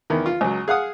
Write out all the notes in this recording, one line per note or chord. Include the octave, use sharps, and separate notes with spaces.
E2 D#3
F4
C#2 F#3
G#4 F5 F#5 D#6